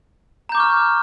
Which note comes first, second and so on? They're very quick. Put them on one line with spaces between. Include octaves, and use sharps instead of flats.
A#5 G6 D6 C#6 F6